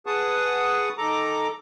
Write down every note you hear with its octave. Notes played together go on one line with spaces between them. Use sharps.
G#4 B4 F#5 A5 C#6 D#6
D#3 A4 A#5 D6